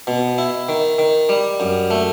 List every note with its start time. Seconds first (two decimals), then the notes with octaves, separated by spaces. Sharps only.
0.07 B2
0.38 E4
0.69 D#3
0.99 D#3
1.29 G3
1.60 F#2
1.91 A3